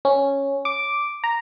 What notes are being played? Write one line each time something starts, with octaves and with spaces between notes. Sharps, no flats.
C#4
D6
A#5